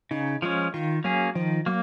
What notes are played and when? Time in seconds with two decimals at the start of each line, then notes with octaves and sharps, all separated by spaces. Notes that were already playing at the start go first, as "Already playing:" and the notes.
0.11 C#3 D#4
0.42 F3 G#3 C#4 F4
0.74 D#3 F4
1.04 F#3 A#3 C#4 G#4
1.35 D#3 F3
1.66 F#3 A#3